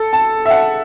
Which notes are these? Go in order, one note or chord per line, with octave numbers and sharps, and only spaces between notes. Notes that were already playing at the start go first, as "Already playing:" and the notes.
Already playing: A4
A5
E5
F#5